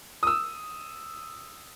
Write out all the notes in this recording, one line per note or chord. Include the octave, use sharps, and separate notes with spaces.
D#6 E6